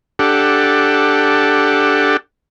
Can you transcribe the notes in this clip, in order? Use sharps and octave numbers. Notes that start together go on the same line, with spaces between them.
D4 G4 A4 F#5